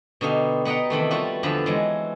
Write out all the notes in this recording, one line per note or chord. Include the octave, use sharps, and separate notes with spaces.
B2 D3 D#4 G4 F5
B3 B4 D#5 F#5 G5 A#5
C3 D#3 E3 A3
G3 F4 F#4 B4
E2 D3 F3 B4 B5
E3 F#3 G#3